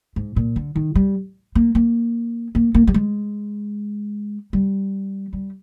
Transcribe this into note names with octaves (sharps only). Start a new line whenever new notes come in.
G#2
A#2
D3
D#3
G3
A#3
A#3
A#3
A#3
G3
G#3
G3
G3